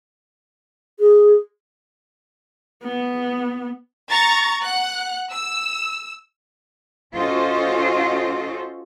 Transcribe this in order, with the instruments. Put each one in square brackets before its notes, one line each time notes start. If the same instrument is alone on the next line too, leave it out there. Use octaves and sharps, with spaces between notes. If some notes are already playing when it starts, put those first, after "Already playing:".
[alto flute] G#4
[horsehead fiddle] B3
[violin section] A#5 C#6 A6
F#5 F#6
E6
[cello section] C#4 F4 F#4 A4 C5 D#5